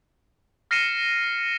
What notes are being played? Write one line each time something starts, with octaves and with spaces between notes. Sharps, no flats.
F6 A#6 C7 C#7 D#7 E7